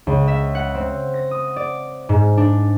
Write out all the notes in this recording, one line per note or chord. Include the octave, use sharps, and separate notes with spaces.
C#2
E5
F#5
C4
A#6
D#6
D5
G#2
D4